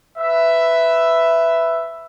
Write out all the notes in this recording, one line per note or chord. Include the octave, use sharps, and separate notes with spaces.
B4 E5